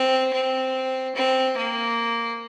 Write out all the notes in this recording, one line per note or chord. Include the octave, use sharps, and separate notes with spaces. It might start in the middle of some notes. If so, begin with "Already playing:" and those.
Already playing: C4
C4
C4
A#3